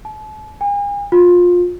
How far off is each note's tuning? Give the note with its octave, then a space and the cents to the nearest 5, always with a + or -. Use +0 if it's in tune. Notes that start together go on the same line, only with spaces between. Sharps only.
A5 -40
G#5 -40
F4 +20